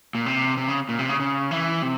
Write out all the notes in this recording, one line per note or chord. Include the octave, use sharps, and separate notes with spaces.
A#2
C3
C3
C#3
A#2
C3
C#3
C#3
E3
C3